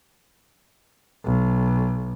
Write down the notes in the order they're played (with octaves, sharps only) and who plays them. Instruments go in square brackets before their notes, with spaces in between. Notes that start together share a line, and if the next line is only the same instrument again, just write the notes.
[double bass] B1